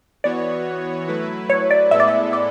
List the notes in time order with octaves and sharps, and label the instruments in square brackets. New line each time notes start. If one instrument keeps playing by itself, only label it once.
[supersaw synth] E3 B3 F#4 C#5 [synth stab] D5
[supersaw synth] F#3 A3 E4 B4
[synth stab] C#5
D5
[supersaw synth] A2 G#3 B3 E4 A4 [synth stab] E5
[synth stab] D5
E5
D5